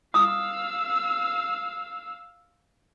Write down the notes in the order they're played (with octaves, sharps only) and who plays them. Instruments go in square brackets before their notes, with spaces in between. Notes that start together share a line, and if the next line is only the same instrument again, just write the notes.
[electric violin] F5 E6 [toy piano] D#6